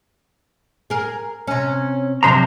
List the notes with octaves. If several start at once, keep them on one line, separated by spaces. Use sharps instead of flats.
G#4 A#4
C3 C#4
C3 F3 F#3 D4 C5 A#5